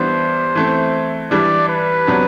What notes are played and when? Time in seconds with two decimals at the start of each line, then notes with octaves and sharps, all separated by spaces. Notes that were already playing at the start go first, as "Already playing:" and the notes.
Already playing: E3 G3 B3 D4 C5
0.55 E3 A3 C4
1.31 E3 G3 D4 D5
1.69 B4
2.07 C3 F#3 B3 D4